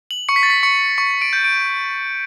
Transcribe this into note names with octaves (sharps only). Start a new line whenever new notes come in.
F#7
C#6 C#7
B6
A6
B6
C#6 C#7
C#6 C#7
D7
G6
D7